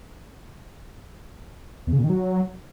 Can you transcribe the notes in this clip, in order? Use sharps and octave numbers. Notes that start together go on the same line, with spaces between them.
E2
C#3
A#2
D#3
F#3